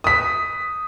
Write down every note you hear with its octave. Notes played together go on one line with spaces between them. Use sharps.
D#6 B6